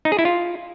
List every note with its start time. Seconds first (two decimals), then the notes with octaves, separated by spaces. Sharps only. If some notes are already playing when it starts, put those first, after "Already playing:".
0.05 D#4
0.12 G#4
0.19 E4
0.25 F4